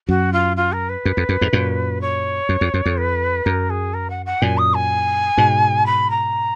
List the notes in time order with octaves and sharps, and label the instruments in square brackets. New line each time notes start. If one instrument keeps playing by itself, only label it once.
[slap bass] F#2 [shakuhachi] F#4
[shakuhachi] F4
F4
A#4
B4
[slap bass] F#2
F2
F#2
F2 G#2
F#2 A#2
[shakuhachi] C#5
[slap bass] F#2
F2
F#2
F2
[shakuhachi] B4
[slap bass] F#2 [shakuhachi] A#4
[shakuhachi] G#4
A#4
F#5
F#5
[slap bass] F#2 A#2 [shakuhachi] G#5
[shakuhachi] D#6
G#5
[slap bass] G#2 B2
[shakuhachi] B5
A#5